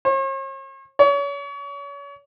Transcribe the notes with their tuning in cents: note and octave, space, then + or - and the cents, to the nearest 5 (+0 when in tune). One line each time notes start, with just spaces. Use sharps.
C#5 -45
C#5 +35